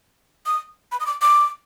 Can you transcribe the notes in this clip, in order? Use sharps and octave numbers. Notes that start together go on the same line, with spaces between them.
D#6
B5
D#6
D6
D6